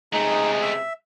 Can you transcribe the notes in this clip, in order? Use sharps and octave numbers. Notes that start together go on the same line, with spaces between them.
C#2 C3 G#3 A3 D#4 G#4 D#5
E5